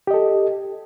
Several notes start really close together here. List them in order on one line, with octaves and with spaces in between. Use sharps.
G4 D#5 A4